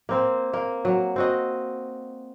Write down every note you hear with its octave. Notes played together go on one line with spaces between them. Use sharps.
A#3 C4 C5
A#3
F#3
C4 F#4 D#5